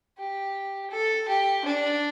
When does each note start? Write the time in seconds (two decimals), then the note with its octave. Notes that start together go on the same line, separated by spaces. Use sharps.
0.18 G4
0.90 A4
1.28 G4
1.65 D4